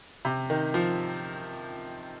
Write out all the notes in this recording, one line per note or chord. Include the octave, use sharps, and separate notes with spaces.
C3
D#3
F3